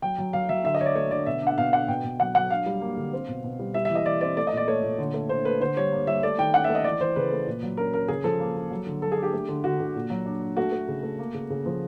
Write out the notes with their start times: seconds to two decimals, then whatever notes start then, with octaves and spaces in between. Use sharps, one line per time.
0.02 F#3 G5
0.18 F#3
0.33 F#3 F5
0.49 F#3 E5
0.64 D3 E5
0.75 D#5
0.80 D3 C#5
0.86 D5
0.95 A3 C#5
1.11 D3 D5
1.26 B2 E5
1.42 D4 F#5
1.58 B2 F5
1.73 D4 F#5
1.88 B2 G5
2.04 B2
2.20 F#3 F#5
2.35 F#3 F#5
2.50 D4 F5
2.66 G3
2.81 A#3
2.97 D3
3.13 C4
3.28 B2
3.44 B2
3.59 G3
3.74 G3 E5
3.85 E5
3.90 E3
3.95 D#5
4.06 E3 D5
4.21 C4 D5
4.37 A3 D5
4.47 D#5
4.52 A#2 D5
4.68 A3 C#5
4.83 A#2
4.98 D3
5.14 A3
5.29 D3 C5
5.45 A3 B4
5.61 D3 C5
5.77 G3 C#5
5.92 A#3
6.07 G3 E5
6.23 A3 D5
6.38 D#3 G5
6.54 C#4 F#5
6.64 E5
6.70 A3
6.75 D#5
6.84 E3 D5
7.01 E3 C5
7.16 C#3 B4
7.32 A3
7.47 A#2
7.63 F#3
7.77 C#4 A#4
7.93 C#4 A#4
8.08 C#3 G#4
8.24 F3 A4
8.40 A#3
8.56 A#3
8.71 F#3
8.87 D3
9.02 F#3 A4
9.12 G#4
9.17 D4
9.23 G4
9.33 A3
9.48 D3
9.64 D3 F#4
9.80 D3
9.95 A#2
10.10 F#3
10.26 D4
10.42 D4
10.57 A3 F#4
10.72 A3
10.88 C#3
11.03 A3
11.19 A#3
11.34 C#3
11.50 C#3
11.66 F3